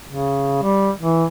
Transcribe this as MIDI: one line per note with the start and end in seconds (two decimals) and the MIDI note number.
0.08 0.62 49
0.63 0.90 55
0.98 1.25 52